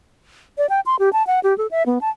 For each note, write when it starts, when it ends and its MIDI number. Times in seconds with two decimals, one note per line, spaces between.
0.58 0.67 74
0.69 0.80 79
0.86 0.96 84
0.99 1.12 67
1.13 1.26 81
1.27 1.40 78
1.43 1.56 67
1.58 1.67 69
1.71 1.86 76
1.86 1.99 59
2.01 2.10 81